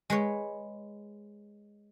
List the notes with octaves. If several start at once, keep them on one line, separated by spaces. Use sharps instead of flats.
G#3 B4 C#5